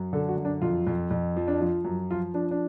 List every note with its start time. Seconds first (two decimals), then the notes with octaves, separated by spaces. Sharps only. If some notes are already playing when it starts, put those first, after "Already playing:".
Already playing: F#2
0.13 D3 A4
0.29 F#4
0.37 F#2
0.45 D4
0.62 F2 F4
0.87 F2
1.11 F2
1.36 F3
1.48 D4
1.61 F3 F4
1.85 F#2
2.11 F3 F4
2.34 F3 D4
2.51 D4